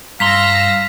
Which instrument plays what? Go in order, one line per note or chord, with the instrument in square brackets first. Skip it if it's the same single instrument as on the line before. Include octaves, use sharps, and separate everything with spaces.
[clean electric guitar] G2 A#5 C6 [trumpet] F5 [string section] E6 A#6 [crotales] B6